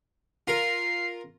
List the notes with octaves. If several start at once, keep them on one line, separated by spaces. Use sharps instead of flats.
F4 A#4 C7